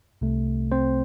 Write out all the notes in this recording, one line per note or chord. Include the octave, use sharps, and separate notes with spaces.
C2 C3 A3
C4 C5